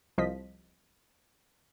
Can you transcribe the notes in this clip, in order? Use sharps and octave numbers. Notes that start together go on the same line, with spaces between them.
C2 F3 D#5 B6